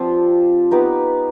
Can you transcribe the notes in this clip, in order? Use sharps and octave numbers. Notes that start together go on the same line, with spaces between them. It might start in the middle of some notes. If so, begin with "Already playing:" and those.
Already playing: F3 C4 D4 F4 G4 C5
B3 D#4 G4 B4